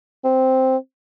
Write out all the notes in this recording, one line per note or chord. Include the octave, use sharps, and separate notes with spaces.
C4